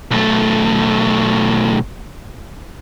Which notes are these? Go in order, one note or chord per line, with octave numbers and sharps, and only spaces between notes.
B1 A3